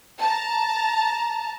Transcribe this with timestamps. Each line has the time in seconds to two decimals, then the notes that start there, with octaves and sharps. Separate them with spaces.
0.20 A5 A#5